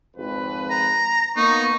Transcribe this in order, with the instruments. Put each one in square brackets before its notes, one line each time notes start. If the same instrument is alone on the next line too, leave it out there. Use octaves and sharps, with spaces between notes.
[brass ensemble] G#1 F2 B4
[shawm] A#5
[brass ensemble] A#3 B3 [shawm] D#4 [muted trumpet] C#6